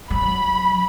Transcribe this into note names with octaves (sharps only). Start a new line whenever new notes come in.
F#3 B5